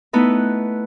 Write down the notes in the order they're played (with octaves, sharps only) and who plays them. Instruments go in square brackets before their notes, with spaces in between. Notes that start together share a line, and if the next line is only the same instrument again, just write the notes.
[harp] A3 B3 D#4 E4 B4